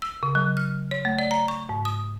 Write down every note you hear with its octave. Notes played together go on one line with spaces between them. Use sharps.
E6
C#3
F#3
F6
C#5
A3
D5
A#5
C#6
G#2
D#6